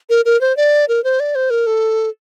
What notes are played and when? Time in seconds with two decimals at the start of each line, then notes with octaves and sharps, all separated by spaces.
0.09 A#4
0.25 A#4
0.41 C5
0.57 D5
0.88 A#4
1.04 C5
1.20 D5
1.35 C5
1.50 A#4
1.66 A4